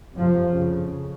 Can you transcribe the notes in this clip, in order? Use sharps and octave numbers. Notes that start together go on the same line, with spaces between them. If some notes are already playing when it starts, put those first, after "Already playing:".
F2 C3 F3
F2 C#3